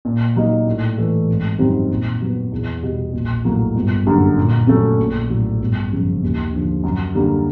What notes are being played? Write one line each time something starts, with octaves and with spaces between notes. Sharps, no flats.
A#2
F#3 A#3 D#4
A2
E3 A3
G#1
F#2 D#3 G3 C4
A#2
F#3 B3
E2
B2 G3
A#1
A2 F#3 A#3
G1
F#2 D3 G3 A#3
A#2
F#3 A3 C#4
A#1
A2 F#3
G1
F#2 C#3 F3
D#2
D3 F3
F#2
D3 G3 A#3